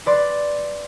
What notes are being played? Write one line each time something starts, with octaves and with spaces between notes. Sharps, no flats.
B4 D5 C6